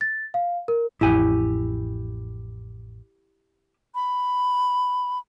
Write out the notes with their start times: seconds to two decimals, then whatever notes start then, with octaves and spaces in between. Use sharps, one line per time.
0.01 A6
0.34 F5
0.68 A#4
1.01 A1 F2 E4 G4 G#5
3.95 B5